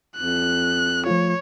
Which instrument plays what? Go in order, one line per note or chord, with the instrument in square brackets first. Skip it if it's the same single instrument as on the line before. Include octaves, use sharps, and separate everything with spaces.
[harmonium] F2 [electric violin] F#6
[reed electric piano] F3 A3 F4 [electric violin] C#5